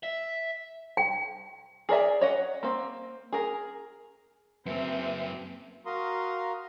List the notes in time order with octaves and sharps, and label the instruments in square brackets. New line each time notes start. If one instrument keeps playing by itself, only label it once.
[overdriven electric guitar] E5
[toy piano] G5
[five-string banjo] G#4 A#4 D5 E5
C#5 D#5 F#5
A#3 C4
G#4 A#4
[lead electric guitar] F#2 A#3 [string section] C4 [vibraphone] B4 E5
[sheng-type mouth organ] F#4 A#4 F5 A#5 C6 D#6